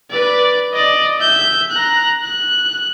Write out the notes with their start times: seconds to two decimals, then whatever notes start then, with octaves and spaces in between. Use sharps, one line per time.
0.11 B4 D5
0.74 D5 D#5
1.19 E5 G6
1.71 A#5 F#6
2.24 F#6